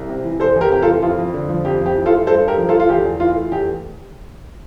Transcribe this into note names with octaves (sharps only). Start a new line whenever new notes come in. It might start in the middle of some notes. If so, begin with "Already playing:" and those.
Already playing: C2
C3
E3
E2 A4 C5
E2
G4 A#4
C3 G4
F4 A4
E3
F2 F4
F2
D3
F3
F2 G4
F2
G4
E3
F4 A4
A3
G2 A4 C5
G2 G4 A#4
F3
F4 A4
A3
F4
E2 G4
E2
E3 F4
A3
E2 G4